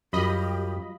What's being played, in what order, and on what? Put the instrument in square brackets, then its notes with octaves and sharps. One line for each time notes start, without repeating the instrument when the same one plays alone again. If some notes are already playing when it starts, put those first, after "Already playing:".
[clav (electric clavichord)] F#2 [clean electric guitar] F#3 G3 F4 [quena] G4 [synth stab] D#5 B5